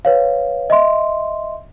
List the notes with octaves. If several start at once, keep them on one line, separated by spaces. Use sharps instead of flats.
B4 C#5 F5
D#5 E5 C6